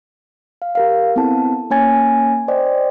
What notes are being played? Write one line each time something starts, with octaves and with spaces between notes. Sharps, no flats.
F5
G4 A#4 F5
B3 C4 E4 A4 A5
A#3 C#4 C#5 G#5 G#6 A6
C5 D5 D#5 G5